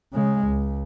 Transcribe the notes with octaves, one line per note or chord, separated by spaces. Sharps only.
C#3 G#3
C#2